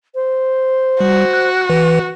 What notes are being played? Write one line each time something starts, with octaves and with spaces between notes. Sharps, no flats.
C5
G3 F#4
F#6
E3 B4